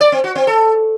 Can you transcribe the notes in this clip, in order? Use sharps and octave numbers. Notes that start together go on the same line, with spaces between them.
D5
C4
F#4
C4
A4